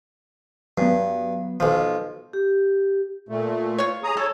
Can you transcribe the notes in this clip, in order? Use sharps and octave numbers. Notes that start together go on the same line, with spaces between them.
G2 F#3 B3
B1 F3
G4
A#2 A3
F4 C#5
G#4 A#5 D#6
A4 C#5